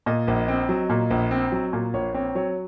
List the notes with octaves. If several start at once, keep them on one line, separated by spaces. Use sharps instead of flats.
A#2 D#5
A#1
C4
F#3
A#2
A#1
C4
F#3
A#2
A#1 C#5
C4 C#5
F#3 C#5